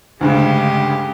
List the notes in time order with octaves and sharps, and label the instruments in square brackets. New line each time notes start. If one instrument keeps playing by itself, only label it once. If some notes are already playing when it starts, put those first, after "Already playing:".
[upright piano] D2 G2 C#3 [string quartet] G#3 G4